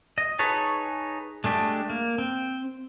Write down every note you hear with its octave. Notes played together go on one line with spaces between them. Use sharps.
D#5
D#4 G#4 B4 C#5 A5
G#3 A3 D4 G4
A#3
C4